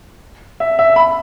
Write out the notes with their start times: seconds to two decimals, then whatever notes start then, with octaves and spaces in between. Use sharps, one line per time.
0.60 E5
0.79 E5
0.96 B5